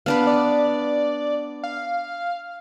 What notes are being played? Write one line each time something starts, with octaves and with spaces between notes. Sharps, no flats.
B3 D4 B4 F5
D5
F5